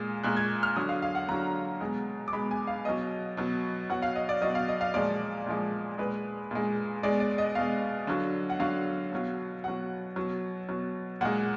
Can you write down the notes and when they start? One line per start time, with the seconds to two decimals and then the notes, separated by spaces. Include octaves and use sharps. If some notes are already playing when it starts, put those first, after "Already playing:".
Already playing: A#2 G#3
0.24 A#2 G#3 F#6
0.37 G#6
0.63 F6
0.76 D3 F#3 D#6
0.89 F5
1.02 F5
1.15 F#5
1.29 D3 F#3 A#5
1.81 B2 G#3
2.28 D6
2.33 B2 G#3 B5
2.51 G#5
2.67 F5
2.85 B2 F#3 D#5
3.37 B2 F#3
3.90 B2 F#3 F#5
4.02 F5
4.16 D#5
4.29 D5
4.42 B2 F#3 D#5
4.55 F5
4.68 D#5
4.81 F5
4.94 A#2 F3 G#3 D5
5.46 A#2 F3 G#3
5.98 A#2 G#3 B4
6.51 A#2 G#3
7.03 B2 G#3 D5
7.20 D5
7.38 D#5
7.55 B2 G#3 F5
8.07 D3 F#3
8.50 F#5
8.59 D3 F#3 F5
9.12 B2 F#3
9.64 B2 F#3 F#5
10.16 B2 F#3
10.69 B2 F#3
11.21 A#2 G#3 F#5